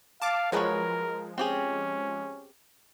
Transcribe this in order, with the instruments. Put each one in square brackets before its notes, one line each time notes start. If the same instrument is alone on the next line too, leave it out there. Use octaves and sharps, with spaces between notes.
[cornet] F5 [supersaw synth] A5 D6
[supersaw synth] F3 G#3 [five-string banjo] F#3 B4 C#5 [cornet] A#4
[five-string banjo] C4 G4 G#4 [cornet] C#4